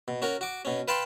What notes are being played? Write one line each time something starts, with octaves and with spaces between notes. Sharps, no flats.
B2
C#4 F#4 A#4
F#4 D6
B2 C#4
B4 F5 G5 A5 B5 C6